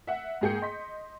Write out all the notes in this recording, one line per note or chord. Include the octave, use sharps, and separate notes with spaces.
E5 F#5
G#2 A#3 G#4 G5 G6 C#7
D#5 C6 B6